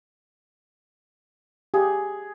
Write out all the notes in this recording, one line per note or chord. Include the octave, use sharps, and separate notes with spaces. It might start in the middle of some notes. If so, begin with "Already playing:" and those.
G4 G#4 F5